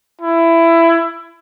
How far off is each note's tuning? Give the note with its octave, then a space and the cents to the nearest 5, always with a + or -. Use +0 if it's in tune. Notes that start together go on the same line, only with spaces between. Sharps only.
E4 +15